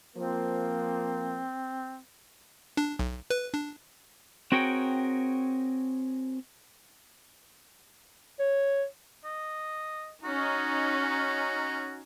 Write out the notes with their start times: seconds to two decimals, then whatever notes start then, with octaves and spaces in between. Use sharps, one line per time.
0.17 F3 A#3 C4
2.77 D4
2.99 B1
3.30 B4
3.54 D4
4.52 C4 F#4 G#4 A#4 C#5 G5
8.39 C#5
9.24 D#5
10.24 C#4 D#4 F#4